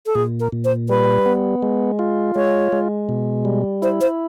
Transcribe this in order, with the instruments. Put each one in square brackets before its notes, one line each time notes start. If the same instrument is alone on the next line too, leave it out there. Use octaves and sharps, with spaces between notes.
[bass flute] A4
[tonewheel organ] A#2 [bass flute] G#4
[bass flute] A#4
[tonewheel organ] A#2
[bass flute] C5
[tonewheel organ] G3 [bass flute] B4
[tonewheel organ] B3
G#3
F4
[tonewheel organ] G#3 [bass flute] C#5
[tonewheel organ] G#3
B2
G3
[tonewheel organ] E4 [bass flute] C5
[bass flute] C5